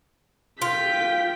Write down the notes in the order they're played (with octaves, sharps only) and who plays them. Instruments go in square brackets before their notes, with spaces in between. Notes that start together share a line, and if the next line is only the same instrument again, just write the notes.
[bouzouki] F4 [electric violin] G5 B6